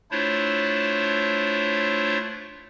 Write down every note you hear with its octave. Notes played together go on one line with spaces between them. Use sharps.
A3 D4 E4 F4 C5 C#5